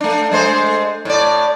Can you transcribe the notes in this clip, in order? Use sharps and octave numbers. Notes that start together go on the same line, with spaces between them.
A3 D4
G#3 A3 C5
A2 D5